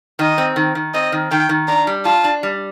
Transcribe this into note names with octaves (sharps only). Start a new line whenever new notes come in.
D#3 D#5
C4
D#3
D#3
C4 D#5
D#3
D#3 G5
D#3
D4 A#5
G3
F4 A5
D4
G3